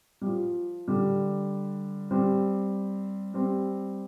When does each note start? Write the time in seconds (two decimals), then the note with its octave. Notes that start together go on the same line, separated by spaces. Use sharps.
0.22 G3
0.26 F3
0.88 D3 G3
2.11 G3 C4
3.34 G3 C4